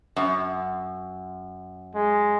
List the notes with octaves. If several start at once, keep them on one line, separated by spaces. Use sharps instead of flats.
F#2
G#3